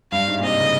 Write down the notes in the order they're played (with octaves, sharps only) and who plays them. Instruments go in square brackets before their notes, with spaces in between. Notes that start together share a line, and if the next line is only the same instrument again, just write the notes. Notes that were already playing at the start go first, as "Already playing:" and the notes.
[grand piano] G2 [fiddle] F5
[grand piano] G#2
A#2
[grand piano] C3 [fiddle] D#5
[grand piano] C#3